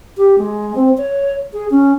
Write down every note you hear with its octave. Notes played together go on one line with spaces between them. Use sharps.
G4
G#3
C4
C#5
G#4
C#4